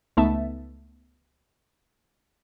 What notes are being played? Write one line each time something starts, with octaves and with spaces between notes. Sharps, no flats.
C#2 A3 B3 D#4 E5 A5